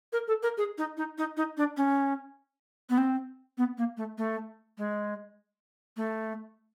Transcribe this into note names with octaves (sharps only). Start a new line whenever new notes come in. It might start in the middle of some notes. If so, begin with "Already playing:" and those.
A#4
A4
A#4
G#4
D#4
D#4
D#4
D#4
D4
C#4
B3
C4
B3
A#3
A3
A3
G#3
A3